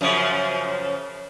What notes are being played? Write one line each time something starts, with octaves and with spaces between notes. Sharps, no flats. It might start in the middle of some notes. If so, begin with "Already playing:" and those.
F#2 C#3 F3